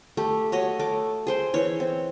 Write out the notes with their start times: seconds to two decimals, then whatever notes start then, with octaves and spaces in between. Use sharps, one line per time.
0.17 A3 G4
0.52 F#4 C#5 D#5
0.79 A3 D6
1.27 G#4 C5 G5
1.54 E3 C#5
1.80 C4